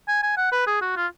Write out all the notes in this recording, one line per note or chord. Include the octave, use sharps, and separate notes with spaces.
G#5
G#5
F#5
B4
G#4
F#4
F4